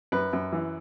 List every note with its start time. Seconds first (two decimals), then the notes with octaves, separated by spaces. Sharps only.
0.12 F#2 B4
0.33 F#2
0.52 E3